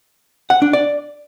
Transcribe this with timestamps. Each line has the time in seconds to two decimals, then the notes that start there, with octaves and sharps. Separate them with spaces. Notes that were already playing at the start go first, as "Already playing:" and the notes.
0.50 F#5
0.62 D4
0.73 D5